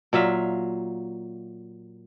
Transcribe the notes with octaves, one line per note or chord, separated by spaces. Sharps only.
A#2 F#3 E5 F5